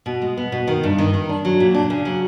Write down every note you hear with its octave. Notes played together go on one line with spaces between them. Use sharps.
B2
G#3
B3
B2
D#3
G2
D#3
D#3
D4
F#3
A#2
D4
C#3
F#3